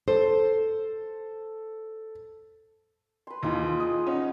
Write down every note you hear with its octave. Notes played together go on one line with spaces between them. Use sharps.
A4 C5
B4 C6
D#2 E3 D#4 F4 G#4
G#4 D#5 D#6
C#4 D#4 F#5